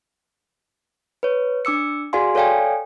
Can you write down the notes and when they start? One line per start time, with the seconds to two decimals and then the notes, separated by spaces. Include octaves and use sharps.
1.23 B4 C#5
1.65 D4 D6 E6 C#7
2.13 F#4 G#4 D5 F5 G#5 C6
2.35 A4 C#5 D5 F5 G5 G#5